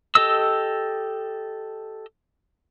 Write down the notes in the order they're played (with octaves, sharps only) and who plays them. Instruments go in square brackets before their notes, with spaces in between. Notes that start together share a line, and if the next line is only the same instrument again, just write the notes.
[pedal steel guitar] G4 A4 D#5 E6